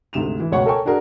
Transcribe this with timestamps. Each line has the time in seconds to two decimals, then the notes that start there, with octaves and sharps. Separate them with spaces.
0.13 D2 G#2 C3 E7 F7
0.40 E3
0.52 C#2 B2 C#5 F#5 C#6
0.66 A4 A#4 C#5 G5 G#5 C#6
0.85 D4 F#4 G#4 A#4